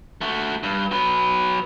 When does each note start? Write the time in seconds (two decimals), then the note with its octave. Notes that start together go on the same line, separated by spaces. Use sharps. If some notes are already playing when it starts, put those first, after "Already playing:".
0.21 A3 F#4
0.63 G2
0.91 F#3 B4